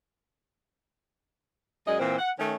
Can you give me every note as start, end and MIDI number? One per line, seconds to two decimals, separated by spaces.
1.87 1.97 42
1.87 1.97 56
1.87 1.97 68
1.87 1.97 74
1.87 1.97 75
2.00 2.18 46
2.00 2.18 52
2.00 2.18 60
2.18 2.30 78
2.38 2.55 51
2.38 2.55 57
2.38 2.55 61